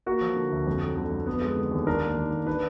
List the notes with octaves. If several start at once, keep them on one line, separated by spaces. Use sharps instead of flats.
A#3 F#4
F3
D3
D2
F2
F#3
D3
F2
B3
G#3
D3
D#2
D4 A#4
A#3
D#3
D#2
D4 B4